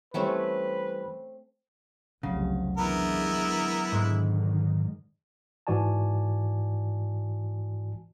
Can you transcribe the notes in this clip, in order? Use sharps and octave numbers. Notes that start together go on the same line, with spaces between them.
E3 G3 A3 C4 C#4 B4
F1 C2 C#3 F#3
D3 E3 G#3 B3 E4 A#4
G#2 B2 D3 D#3 G#3
G#2 E3 F#4 D5 G#5 A5